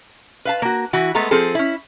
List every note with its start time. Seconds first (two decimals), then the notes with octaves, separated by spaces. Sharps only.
0.45 B4 F5 A5
0.62 A#3 F#4
0.93 E3 E4 F#4
1.15 G#3 A3 B3 A4 A#5
1.31 F3 C4 G#4 A4
1.55 C#4 E4